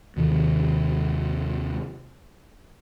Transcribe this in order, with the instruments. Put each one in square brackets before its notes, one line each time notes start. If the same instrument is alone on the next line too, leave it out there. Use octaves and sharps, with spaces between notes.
[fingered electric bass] D#2 C3 D#3